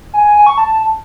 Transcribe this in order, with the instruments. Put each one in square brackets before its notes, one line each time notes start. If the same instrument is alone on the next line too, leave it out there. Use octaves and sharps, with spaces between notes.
[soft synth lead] G#5
G#5
G#5
C#6
A5